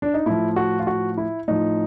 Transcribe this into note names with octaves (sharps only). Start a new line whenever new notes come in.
D4
D#4
A2 F3 E4
F#4
F4
F#4
E4
A2 F3 D#4